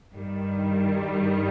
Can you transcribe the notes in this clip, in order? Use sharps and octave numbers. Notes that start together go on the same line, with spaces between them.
G2 D#3 G3